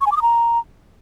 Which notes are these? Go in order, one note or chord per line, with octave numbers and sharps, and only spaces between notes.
C#6
G#5
D6
D#6
A#5